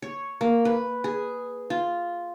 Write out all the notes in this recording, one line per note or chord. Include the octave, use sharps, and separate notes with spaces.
C#5
A#3
B4
G#4
F4